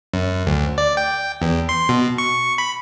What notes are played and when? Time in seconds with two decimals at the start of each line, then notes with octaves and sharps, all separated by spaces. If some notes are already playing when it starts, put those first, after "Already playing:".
0.14 F#2
0.47 D2
0.78 D5
0.97 G5
1.42 E2
1.69 C6
1.89 B2
2.18 C#6
2.58 B5